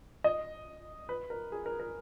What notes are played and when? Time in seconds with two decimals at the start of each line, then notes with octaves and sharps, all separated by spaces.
0.24 D#5
1.09 B4
1.30 A#4
1.52 G#4
1.66 A#4
1.80 A#4